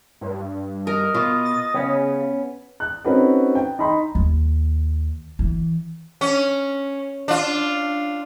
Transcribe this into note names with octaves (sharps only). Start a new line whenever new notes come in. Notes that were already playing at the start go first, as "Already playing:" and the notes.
G2
A#4 D#5
B2 F4
A6
C#3 B3 C#4
F#6
C4 C#4 D#4 F#4 A4 B4
G5
D#4 B5 C6
D#2
E3
C#4
D4 F4